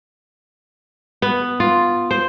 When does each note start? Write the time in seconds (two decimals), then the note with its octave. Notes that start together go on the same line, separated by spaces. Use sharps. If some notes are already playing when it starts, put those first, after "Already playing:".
1.22 B3
1.60 F4
2.11 C5